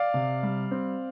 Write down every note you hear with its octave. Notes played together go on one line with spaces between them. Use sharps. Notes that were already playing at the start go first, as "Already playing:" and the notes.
Already playing: D5 F5
C3
G3
C4